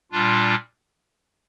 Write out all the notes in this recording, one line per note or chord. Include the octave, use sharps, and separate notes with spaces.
A#2 G3 D4 F4